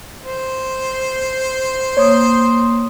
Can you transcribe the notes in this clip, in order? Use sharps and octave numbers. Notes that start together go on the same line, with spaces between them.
C5
A#3 C#5 C6 D#6